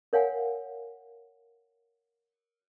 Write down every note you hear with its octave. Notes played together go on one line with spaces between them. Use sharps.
A#4 C#5 F5 F#5 G#5